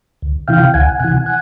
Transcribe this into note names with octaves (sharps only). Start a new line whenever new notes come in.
D2
C3 E3 F5 G5
D2 F#5 G#5
C3 E3 F#5 G#5
F#5 G#5